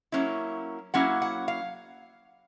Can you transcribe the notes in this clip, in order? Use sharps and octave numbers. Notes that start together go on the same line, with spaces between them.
F#3 A#3 C#4 E4
F#3 A#3 C#4 E4 F#5
F#5
F5